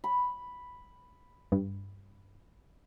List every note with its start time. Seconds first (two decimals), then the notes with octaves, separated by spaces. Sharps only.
0.04 B5
1.52 G2